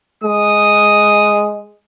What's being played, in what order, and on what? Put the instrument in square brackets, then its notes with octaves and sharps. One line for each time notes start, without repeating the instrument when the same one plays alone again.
[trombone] G#3 [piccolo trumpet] D#6